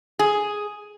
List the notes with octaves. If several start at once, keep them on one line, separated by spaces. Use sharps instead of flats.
G#4